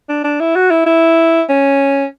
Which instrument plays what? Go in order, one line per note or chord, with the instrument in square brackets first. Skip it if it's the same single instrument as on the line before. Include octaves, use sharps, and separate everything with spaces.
[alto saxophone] D4
D4
E4
F#4
E4
E4
C#4